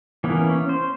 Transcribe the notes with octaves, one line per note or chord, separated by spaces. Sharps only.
E3 A#3 B3 C#4 E4
C#4
C5